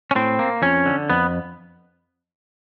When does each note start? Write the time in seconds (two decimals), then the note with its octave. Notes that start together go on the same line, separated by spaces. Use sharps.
0.11 C#4
0.15 A2 C4
0.39 A#3
0.62 F2 C#4
0.86 D3
1.10 F2 B3